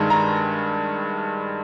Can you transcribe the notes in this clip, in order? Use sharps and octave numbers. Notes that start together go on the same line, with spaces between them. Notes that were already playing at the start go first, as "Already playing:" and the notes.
Already playing: G2 D#3 G#3
A#5